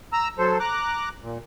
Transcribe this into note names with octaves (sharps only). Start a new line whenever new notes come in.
A#5 E6
F#3 A4 C5
A#5 D6 F#6
A#2